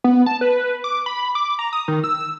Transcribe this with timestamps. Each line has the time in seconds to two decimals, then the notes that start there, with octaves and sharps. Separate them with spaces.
0.04 B3
0.26 A5
0.41 B4
0.84 D6
1.06 B5
1.35 D6
1.59 A#5
1.73 D#6
1.88 D#3
2.04 E6